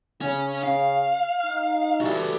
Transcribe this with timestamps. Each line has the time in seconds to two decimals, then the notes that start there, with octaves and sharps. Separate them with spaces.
0.21 C#3 C#4
0.64 F5
1.44 D#4
2.01 E3 G3 A3 F#4 A4